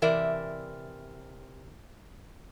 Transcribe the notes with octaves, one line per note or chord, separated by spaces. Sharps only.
C3 E3 A#4 D5 E5